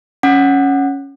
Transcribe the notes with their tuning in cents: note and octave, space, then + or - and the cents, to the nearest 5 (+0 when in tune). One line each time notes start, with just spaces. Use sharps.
C#4 +0 F#5 +0